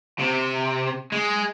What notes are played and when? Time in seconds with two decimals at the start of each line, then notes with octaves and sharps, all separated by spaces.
0.19 C3
1.12 G#3